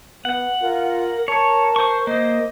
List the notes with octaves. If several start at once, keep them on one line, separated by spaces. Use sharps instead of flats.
B3 F#5
F4 A#4
A#4 C#5 A5
C5 C#6
A#3 C5 D#5